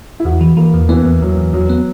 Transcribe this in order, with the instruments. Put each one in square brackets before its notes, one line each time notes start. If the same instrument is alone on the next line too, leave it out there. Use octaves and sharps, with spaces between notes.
[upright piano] E4
[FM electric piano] E2 [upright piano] F#4
[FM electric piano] E3
[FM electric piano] E3 [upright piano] A#3
[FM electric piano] E2
[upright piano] E3 [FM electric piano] B3
[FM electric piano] E2
[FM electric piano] E2 [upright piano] F#3
[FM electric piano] E2
[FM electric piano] E2 [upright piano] F#3
[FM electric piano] B3